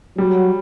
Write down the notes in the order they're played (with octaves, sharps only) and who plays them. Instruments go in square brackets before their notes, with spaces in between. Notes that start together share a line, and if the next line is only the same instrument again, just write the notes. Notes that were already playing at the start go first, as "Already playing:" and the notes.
[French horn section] F#3 [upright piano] G3